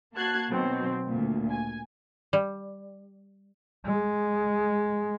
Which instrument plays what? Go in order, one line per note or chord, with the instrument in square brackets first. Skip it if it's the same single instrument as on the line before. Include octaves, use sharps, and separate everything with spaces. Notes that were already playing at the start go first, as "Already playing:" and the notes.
[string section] A#3 F#4 A5 F#6 G#6 C7
B2 D#3 F#3 C4
D2 A#2
G#5
[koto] G3
[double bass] G#3